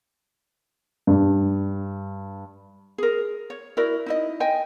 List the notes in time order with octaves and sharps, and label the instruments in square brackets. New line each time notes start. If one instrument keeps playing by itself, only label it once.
[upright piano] G2
[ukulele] G#4 A#4
C#5
E4 F#4 A#4 D5
D#4 E4 D#5
D#5 G5 G#5